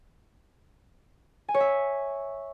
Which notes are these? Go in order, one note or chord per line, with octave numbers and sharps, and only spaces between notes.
G#5
C#5
E5